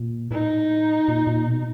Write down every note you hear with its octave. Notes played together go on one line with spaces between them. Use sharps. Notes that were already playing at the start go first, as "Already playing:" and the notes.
Already playing: A#2
A2 D#4
A#2
A#2
B2